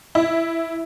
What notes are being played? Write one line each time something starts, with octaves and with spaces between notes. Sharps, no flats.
E4